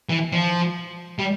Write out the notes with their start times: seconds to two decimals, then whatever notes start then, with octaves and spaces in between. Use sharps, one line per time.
0.09 E3
0.33 F3
1.19 G3